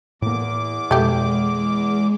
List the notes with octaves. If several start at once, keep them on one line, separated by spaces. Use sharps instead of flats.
E2 A2 A#3 D6
F2 B2 G#3 A3 G4